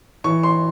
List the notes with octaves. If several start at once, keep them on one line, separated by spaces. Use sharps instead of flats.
E3 C#6
C6